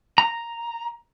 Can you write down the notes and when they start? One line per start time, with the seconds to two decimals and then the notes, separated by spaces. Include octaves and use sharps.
0.18 A#5